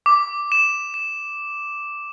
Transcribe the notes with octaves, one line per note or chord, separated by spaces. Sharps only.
D6
E7
E7